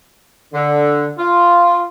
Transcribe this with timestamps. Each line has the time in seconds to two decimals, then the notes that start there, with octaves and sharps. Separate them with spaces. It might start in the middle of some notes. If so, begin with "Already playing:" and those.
0.53 D3
1.18 F4